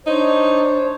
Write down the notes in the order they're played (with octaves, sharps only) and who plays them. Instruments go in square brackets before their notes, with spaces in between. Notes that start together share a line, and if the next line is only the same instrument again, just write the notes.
[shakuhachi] D4 [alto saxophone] D#4 [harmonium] C5 C#5